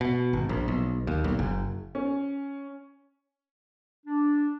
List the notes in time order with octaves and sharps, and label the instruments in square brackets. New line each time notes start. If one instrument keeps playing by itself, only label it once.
[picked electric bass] B2
G#1
A#1
B1
D#2
B1
F#1
[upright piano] C#4
[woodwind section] D4